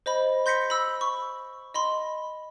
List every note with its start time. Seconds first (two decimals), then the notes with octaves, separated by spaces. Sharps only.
0.06 C5 D#5 B5
0.46 C6 G6 A#6 B6 C#7
0.70 B5 E6
1.01 C#6
1.74 D#5 B5 C6